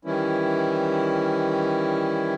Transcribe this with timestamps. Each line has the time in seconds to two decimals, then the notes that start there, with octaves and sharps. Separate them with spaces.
0.05 D#3 E3 G3 C#4 E4